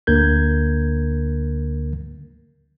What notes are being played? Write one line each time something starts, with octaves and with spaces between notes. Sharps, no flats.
D2 D3 A#3 A#4 G6 G#6